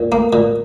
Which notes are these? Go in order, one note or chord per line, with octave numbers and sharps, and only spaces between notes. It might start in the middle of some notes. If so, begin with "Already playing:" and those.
Already playing: A#2
A#3
A#2